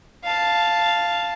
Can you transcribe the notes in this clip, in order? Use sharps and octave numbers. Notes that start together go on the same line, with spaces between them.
F5 A5